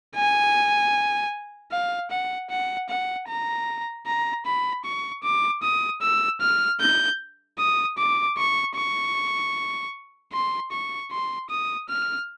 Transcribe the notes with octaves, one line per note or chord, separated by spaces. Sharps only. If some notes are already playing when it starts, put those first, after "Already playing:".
G#5
F5
F#5
F#5
F#5
A#5
A#5
B5
C#6
D6
D#6
E6
F6
G6
D#6
D6
C#6
C#6
C6
C#6
C6
D#6
F6